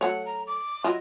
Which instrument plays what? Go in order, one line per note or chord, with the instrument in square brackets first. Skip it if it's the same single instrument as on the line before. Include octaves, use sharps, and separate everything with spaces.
[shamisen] F#3 A3 C#5 [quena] F#5
[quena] A#5
D6
[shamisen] F#3 E4 F4 [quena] D#5